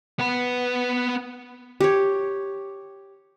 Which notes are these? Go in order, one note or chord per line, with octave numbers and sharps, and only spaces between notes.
B3 B4
G4 C#5